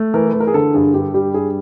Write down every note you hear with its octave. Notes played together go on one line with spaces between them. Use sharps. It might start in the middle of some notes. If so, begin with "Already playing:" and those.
Already playing: A3
E3 A#4
B4
E3
A#4
G#4
D3 A4
G2 G#4
G2 G4
G3 G4
G2 G#4